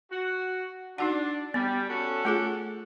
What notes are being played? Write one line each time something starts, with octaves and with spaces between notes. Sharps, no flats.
F#4
D4 D#4 F#4 F#5
G3 B3
C#4 F#4 A4
A3 F4 G#4